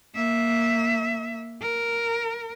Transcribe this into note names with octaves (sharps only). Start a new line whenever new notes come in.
A#3 E5
A#4